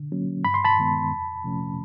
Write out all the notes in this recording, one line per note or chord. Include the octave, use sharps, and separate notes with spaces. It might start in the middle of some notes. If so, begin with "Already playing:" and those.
Already playing: D3
F#3 A#3 C#4
G2 B5
C6
A5 B5
D#3 G#3 B3
F2
C3 F3 A3 C#4